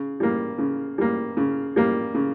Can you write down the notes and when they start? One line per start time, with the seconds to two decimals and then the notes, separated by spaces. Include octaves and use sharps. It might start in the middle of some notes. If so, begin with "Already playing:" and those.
Already playing: C#3
0.20 G3 A#3
0.58 C#3
0.98 G3 A#3
1.37 C#3
1.76 G3 A#3
2.14 C#3